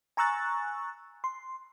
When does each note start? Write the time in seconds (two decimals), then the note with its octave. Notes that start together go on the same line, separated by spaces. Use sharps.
0.17 G#5 A#5 C#6 E6 F#6 A6
1.24 C6